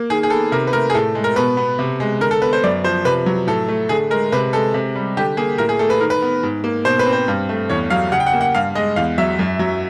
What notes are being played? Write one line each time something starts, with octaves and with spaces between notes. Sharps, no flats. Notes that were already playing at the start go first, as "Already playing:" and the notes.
Already playing: A#3
D#3 G#4
G#4
B3 A4
C3 A#4
B4
A3 A#4
G#4
A2 A4
G#3
A#4
B2 B4
B3
C3
G#3
D3 A#4
A4
B3 B4
C5
F#2 D5
F3 C5
C3 B4
F#3
A2 A4
A3
D3 G#4
G#3 A#4
C3 B4
G#3 A4
C3
G3
D3 G4
A#3 G#4
A2 A#4
G#4
A3 A4
B4
D#3 A#4
B4
B3
G#2
A#3
B2 C5
B4
C4
C5
G2
A3
E2 C#5
F#3 F5
C#3 F#5
G5
F#5
A#3
F#5
G2 F5
G#3 D#5
E2 F5
F#3 E5
F#2
F#3